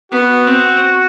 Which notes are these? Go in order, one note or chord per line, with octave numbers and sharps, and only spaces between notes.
B3 F#4
C4